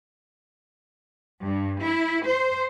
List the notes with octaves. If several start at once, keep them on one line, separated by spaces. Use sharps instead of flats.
G2
E4
C5